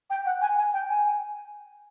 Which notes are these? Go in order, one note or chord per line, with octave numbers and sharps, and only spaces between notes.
G5
F#5
G#5
G#5
G5
G#5